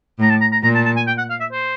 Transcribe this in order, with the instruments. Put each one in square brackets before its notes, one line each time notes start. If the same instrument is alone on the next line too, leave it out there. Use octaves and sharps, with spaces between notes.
[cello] A2 [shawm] A#5
[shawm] A5
A#5
A#5
[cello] A#2 [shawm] A#5
[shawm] A5
A5
G#5
G5
F#5
F5
E5
C5